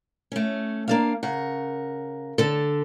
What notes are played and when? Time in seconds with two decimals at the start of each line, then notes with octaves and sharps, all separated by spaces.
0.32 A3 C#4
0.88 A#3 D4 F5
1.23 C#3 A#4 F#5
2.38 D3 A4